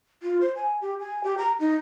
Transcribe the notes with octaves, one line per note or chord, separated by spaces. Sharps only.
F4
C5
G#5
G4
G#5
G4
A#5
D#4